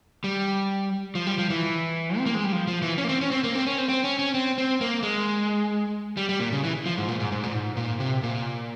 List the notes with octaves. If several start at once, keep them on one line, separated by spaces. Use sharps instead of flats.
G3
F3
G3
F3
E3
C4
A#3
G#3
G3
F3
F3
E3
C#4
A#3
C4
C#4
C4
A#3
C4
C#4
C4
C4
C#4
C#4
C4
C4
A#3
G#3
G3
G3
A#2
C#3
E3
F3
G#2
A#2
G#2
G#2
A#2
G#2
A#2
C3
A#2